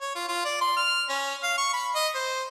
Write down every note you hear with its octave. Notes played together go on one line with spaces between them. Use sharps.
C#5
F4
F4
D5
C6
F6
C#4
F5
C#6
B5
D#5
C5